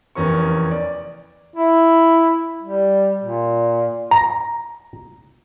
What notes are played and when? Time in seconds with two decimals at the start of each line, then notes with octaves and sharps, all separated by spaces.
0.15 F1 E2 C#4 A#4 C#6
0.71 D5
1.56 E4
2.63 G3
3.22 A#2
4.11 A#5